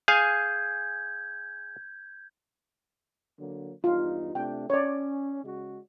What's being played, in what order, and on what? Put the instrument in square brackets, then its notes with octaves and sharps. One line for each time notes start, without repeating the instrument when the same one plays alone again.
[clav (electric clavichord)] G#4 F5 G#5 [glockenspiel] G6 G#6
[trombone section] D3 F#3 A#3
[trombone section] E2 G2 D#4 [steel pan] F4
[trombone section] C3 A3 D4 [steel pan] G5
[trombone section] C#4 [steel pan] C#5 D5
[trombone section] C#3 G#3 F#4